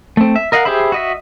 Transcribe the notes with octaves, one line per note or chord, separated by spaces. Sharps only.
A3 C4
E5
A#4 D#5 F5 F#5
G4 G#4 C5 E5 B5
F#4 D#5 E5